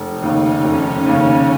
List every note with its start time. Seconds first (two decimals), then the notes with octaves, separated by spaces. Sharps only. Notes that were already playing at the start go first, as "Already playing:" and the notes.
Already playing: F1
0.09 D#4
0.22 D#2 C#3
0.37 D#4
0.65 F1 C#4
1.06 D#2 C#3